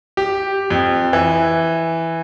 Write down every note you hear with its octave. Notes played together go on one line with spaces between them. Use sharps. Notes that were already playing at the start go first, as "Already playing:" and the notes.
G4
F2
E3